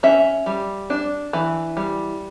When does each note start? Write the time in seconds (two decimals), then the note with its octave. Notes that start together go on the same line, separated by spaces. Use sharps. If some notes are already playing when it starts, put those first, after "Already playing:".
0.03 C#4 E5
0.46 G3
0.90 D4
1.33 E3
1.77 G3